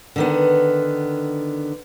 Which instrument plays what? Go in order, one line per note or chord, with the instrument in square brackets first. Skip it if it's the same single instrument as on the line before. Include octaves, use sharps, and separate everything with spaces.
[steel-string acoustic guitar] D3 D#3 B3